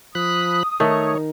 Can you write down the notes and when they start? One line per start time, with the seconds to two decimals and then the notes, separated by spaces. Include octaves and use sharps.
0.15 F3 B5 D#6 F#6
0.80 D#3 A3 C#5